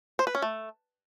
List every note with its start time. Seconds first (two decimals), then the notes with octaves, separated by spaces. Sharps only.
0.19 C5
0.27 B4
0.35 C#4
0.42 A3